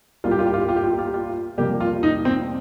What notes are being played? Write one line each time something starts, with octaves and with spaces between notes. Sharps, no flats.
C2 A#2 G3 A#3 F4
G4
F4
G4
F4
G4
F4
G4
F4
G4
F4
G4
F4
F2 C3 G3 A#3 G4
F4
D#4
C4